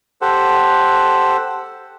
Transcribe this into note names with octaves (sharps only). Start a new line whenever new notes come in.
G4 A4 C5 F#5